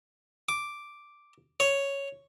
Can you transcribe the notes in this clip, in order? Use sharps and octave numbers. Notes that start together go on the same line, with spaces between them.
D6
C#5